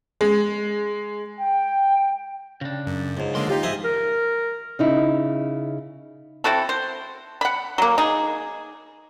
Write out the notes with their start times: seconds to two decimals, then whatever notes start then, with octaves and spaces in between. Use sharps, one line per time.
0.21 G#3
1.38 G5
2.61 C#3 D4
2.87 F#2
3.17 C#2 G#2
3.35 D#2 D3 G#3 A#3 C6
3.49 D#4 F4 G4
3.63 G#2 F3 G#4 D#5 E5
3.84 A#4
4.79 C#3 D#4 E4
6.44 C4 E4 F#4 A4
6.69 C5
7.41 F#5 B5
7.78 F#3 A#3
7.98 D#4 G#4